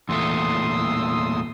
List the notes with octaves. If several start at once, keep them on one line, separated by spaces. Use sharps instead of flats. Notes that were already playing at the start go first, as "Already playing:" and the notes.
E2 A#2 A3 C6 D#6 E6